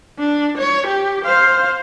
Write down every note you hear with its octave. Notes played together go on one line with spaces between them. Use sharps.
D4
C#5
G4
C5 F5